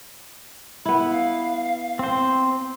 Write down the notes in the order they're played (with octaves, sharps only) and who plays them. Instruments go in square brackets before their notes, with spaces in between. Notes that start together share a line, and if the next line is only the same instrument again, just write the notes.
[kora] B3 E4
[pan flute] F5
[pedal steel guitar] C4 C5